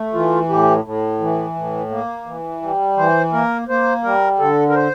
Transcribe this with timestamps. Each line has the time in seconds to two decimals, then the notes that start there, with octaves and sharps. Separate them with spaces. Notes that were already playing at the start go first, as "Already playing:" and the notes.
Already playing: A3
0.13 E3 F4
0.49 A2 G4
0.84 A2
1.20 E3
1.55 A2
1.91 A#3
2.26 E3
2.62 G3
2.97 E3 C5
3.33 A#3 A#4
3.68 A#3 C5
4.03 G3 A#4
4.39 D3 A4
4.70 A#4
4.75 C5